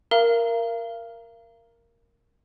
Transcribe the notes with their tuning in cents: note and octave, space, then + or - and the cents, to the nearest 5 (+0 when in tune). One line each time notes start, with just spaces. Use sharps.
A#4 +0 F5 -35 A#5 +0